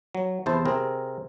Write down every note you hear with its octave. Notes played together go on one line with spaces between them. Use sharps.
F#3
E2 C3 E4 C5 A5
C3 C4 G#4 A#4